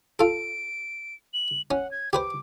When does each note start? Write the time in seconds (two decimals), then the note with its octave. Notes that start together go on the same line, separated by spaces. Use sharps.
0.19 F4 A4 D7
1.34 F#7
1.71 C#4 F#5
1.91 G#6
2.13 G4 B4 C5 D6